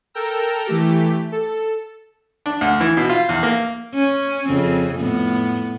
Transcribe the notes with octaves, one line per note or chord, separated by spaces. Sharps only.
A4 A#4 G5 A#5 E6
E3 A3 G4
A4
D4
D2
E3
B2
F4
E2
A#3
C#4
F2 C#3 C4
A2 B3